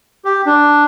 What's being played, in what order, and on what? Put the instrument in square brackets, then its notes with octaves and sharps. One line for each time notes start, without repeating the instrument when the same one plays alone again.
[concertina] G4
D4